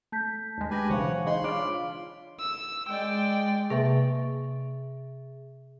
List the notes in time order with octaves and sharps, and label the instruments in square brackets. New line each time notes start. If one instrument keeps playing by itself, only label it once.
[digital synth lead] A3 [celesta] A5 G6 B6
[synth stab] D#2 G#3
[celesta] D4 A#6 [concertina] G4 B4 G#5
[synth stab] B1 C#3 [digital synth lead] E3 [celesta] C5 F5 [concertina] C#5 F#5
[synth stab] G#3 D#4 G#4 [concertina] B5 C6
[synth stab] D4 F4 [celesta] C#5 D6 D7 [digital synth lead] F5
[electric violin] E6
[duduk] G#3 [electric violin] D5 G5
[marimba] C3 A#3 [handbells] G#4 E5